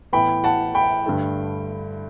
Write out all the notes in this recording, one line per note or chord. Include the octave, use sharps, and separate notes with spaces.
A2 E3 B3 G5 B5
F#5 A5
G5 B5
G2 D3 A3